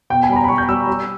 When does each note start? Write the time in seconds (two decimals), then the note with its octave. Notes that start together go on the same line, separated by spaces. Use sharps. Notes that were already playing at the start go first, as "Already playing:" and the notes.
0.10 B2 G5
0.23 G#5
0.29 G3 B5
0.36 A#5
0.44 B5
0.48 G3 C#6
0.58 G6
0.69 G3 E6
0.87 G3